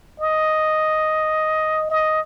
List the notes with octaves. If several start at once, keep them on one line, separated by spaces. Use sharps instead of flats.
D#5
D#5